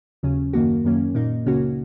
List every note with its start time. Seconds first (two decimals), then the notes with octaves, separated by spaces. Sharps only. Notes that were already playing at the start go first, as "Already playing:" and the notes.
0.23 D#2 C#3 F#3 C#4
0.53 F#2 D#3 A#3 F#4
0.84 F#2 D#3 F#3 A#3 C#4
1.15 A#2 A#3 D#4
1.46 C#2 C#3 A#3 C#4 F#4